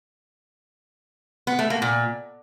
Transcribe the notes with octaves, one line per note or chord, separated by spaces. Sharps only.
B3
A3
A#3
A#2